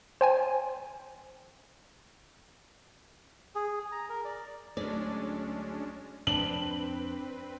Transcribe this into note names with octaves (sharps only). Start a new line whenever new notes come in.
C5 G5 G#5
G#4
A#5
A#4
D5
D2 F#3 G#3 A3 C#4 D4 D5
F2 C4 D4 B4 F#7